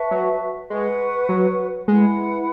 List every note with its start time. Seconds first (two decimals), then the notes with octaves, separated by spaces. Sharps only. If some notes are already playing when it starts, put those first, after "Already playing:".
Already playing: B4 E5 A5 C#6
0.11 F#3
0.70 G#3 B4 F#5 C#6
1.29 F#3
1.87 G#3 E4 B4 F#5